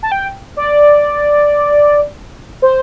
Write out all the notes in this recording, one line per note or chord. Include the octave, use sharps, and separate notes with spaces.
A5
G5
D5
C5